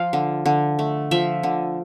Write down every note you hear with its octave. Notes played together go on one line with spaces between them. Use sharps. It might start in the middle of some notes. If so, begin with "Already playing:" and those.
Already playing: F3 F5
D3
D3
A3
F3 E5
D3